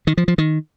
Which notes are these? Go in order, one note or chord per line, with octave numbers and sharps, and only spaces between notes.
D#3
F3
F3
D#3